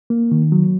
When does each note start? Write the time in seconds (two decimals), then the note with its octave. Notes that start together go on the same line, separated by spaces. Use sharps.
0.10 A#3
0.32 D#3
0.52 F#3